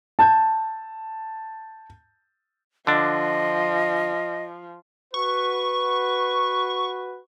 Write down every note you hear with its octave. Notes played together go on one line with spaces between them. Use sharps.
A5 G6
D3 F3 D4 D#5
F#4 B4 C#6